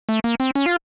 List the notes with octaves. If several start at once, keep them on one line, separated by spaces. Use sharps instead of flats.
A3
A#3
C4
C#4
F4